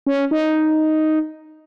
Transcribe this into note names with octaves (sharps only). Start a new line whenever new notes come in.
C#4
D#4